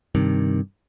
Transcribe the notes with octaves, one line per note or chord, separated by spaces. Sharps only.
G2 C3 D#3